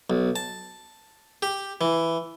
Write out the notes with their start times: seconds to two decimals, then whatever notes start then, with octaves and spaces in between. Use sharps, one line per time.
0.10 B1
0.36 A5
1.42 G4
1.81 E3